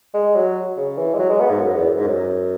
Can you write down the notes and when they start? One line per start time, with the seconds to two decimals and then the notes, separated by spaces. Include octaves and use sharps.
0.14 G#3
0.35 F#3
0.77 C#3
0.98 E3
1.14 G#3
1.19 F#3
1.30 G#3
1.40 B3
1.50 G#2
1.61 F#2
1.75 E2
1.89 F#2
1.98 G#2
2.07 F#2